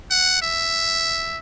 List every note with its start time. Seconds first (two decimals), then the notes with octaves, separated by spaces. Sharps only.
0.11 F#5
0.42 E5